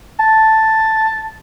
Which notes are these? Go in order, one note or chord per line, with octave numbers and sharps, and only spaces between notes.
A5